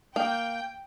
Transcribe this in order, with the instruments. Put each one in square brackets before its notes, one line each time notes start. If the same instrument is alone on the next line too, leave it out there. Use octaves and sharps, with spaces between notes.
[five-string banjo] A#3 [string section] G5